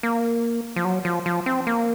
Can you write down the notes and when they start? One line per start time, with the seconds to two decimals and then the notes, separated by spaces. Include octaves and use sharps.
0.03 A#3
0.76 F3
0.85 F#3
1.05 F3
1.26 F3
1.46 C4
1.67 A#3